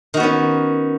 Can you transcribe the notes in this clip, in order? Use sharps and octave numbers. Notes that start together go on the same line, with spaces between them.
D#3 B3 C#4 F#4